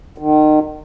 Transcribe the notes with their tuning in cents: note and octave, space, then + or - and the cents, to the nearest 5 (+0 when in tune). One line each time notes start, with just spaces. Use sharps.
D#3 -30